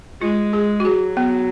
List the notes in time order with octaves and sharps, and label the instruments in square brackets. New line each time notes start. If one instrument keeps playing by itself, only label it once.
[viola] G#3 [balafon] F4
[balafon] G#4
F#4
[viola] F#3 [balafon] G#4
[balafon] B3